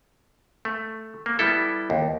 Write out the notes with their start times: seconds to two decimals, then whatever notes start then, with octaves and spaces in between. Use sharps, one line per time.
0.65 A3
1.26 A#3
1.39 G3 B3 E4 A4
1.90 D#2